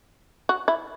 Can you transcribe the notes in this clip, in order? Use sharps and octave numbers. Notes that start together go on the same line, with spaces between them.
F#4
E4